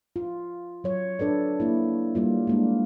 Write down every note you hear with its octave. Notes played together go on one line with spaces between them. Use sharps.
F4
F#3 C#5
D4 A4 B4 D5
A#3 D4 E4
G3 A#3 F4
G#3 A#3 D4